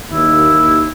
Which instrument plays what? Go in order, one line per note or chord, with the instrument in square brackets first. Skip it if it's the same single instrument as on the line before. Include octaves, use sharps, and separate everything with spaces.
[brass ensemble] D#2 [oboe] E4